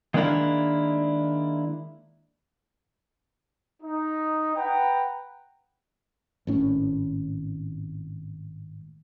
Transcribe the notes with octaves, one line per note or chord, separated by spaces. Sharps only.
D#3 G#3 A#3 D4 E4 A#4
D#4
B4 F#5 G5 A#5
G#1 A2 C#4